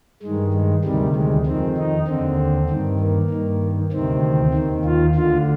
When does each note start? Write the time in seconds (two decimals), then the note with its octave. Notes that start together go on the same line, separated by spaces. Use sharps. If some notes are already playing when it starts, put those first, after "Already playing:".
0.23 G2 D#3 G#3
0.54 G#3
0.84 D2 C3 D#3 G3
1.15 G#3
1.46 F2 D#3 C4
1.77 D#4
2.08 D#2 D3 C4
2.70 G2 D#3
3.00 A#3
3.30 G2 D#3
3.92 D2 C3 D#3 C4
4.54 D#2 D#3
4.84 F4
5.15 D2 D3 F4